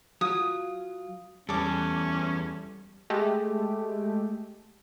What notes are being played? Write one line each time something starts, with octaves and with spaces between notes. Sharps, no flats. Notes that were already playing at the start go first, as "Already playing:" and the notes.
F#3 F4 D#6
E2 E3 G3 C#4 A4 D6
G#3 A3 G4